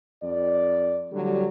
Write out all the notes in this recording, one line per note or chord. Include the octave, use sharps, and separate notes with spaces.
F2 D5
A2 D3 F#3 G3